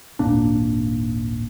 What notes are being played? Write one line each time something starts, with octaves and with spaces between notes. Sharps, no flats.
D#1 G#1 A#2 D4